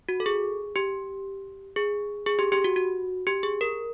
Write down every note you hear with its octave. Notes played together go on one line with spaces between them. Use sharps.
F#4
A4
G#4
G4
G#4
G#4
G4
G4
F#4
F#4
G4
G#4
A#4